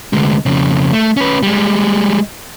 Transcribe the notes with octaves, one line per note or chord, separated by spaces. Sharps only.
D2 G#3
F2 C#3
A3
C#4 B4
G3 G#3